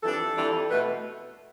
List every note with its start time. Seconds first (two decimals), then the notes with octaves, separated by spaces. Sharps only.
0.02 F2 E3 G3 D4 A4
0.37 F2 E3 G3 D4
0.70 B2 A3 B4